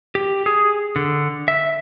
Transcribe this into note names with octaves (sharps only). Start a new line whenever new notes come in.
G4
G#4
D3
E5